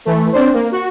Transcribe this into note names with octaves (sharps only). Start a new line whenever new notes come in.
E3 A3
C4 D4 C5
A#3
F#4